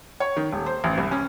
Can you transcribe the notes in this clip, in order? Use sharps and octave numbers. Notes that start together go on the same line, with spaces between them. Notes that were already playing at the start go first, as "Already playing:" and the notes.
C#5
D#3
D#1
C5
A1
C2
C#4